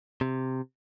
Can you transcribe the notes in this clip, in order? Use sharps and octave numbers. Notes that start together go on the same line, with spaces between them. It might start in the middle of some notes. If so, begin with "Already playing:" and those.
C3